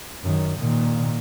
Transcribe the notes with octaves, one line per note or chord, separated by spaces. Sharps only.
F#2 D#3
A#2 D#3